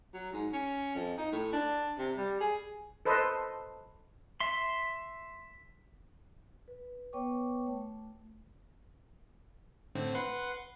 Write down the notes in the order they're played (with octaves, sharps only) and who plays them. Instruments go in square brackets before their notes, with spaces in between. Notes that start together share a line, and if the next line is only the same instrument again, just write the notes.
[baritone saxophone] F#3
G#2
C#4
F2
D#4
A2
D4
C3
G3
G#4
[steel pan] A4 B4 C5 D#5
[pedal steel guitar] E5 C6
[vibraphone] B4
B3 B4 C#5 G5 C#6 D6
A3
[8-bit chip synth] A2 D3 C4
B4 F#5 C6